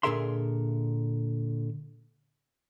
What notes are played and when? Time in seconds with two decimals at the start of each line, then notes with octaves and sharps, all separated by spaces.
0.03 A#2 D3 G#4 A#4 E5 C6